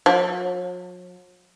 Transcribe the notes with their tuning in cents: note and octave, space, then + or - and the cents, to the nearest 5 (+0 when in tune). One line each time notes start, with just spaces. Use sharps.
F#3 -45